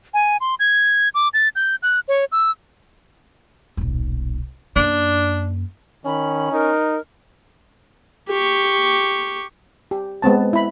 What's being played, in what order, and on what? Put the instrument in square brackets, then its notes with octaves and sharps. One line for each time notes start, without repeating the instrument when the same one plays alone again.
[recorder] G#5
C6
G#6
D6
A6
G6
F#6
C#5
E6
[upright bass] D#1 B1
[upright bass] F#2 A#3 [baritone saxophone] D4
[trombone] D#3 [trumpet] C#4 [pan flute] B5
[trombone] D#4 [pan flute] A#4
[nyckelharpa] G4 C#6
[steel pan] G4
G#3 B3 C4 A5
E4 B5